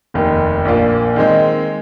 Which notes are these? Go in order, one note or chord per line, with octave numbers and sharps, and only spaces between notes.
F1 D#2 D#3
A#1 A#2 A#3 F4
D#3 G#3 C4 D#4